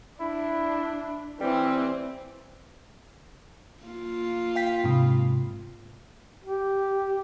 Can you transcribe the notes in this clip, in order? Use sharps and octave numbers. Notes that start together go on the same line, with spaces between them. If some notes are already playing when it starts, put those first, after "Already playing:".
D4 E4
E3 G3 C4
A#3 F4
F5 G5 B6
G#2 C3
G4